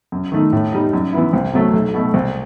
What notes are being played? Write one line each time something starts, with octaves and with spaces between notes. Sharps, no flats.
F#2
D#3 A3 D#4
A2
G3 D#4
F#2
E3 B3 E4
C2
C3 F#3 A3
B1
B2 A3
C2